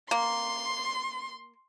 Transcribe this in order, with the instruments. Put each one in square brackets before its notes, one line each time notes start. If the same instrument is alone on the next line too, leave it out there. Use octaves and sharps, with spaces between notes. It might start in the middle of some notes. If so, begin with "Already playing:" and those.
[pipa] A#3 [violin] C6